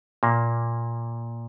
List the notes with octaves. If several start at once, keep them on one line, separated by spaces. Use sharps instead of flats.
A#2 A#3